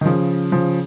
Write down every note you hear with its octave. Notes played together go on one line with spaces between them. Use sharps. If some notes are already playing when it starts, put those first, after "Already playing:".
D#3
C#3 F3
C#3 F3